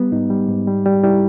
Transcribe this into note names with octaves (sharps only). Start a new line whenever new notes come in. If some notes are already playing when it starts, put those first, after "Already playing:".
Already playing: G3 B3
G#2 D#4
G3
G#2
G3
G3
G3 E4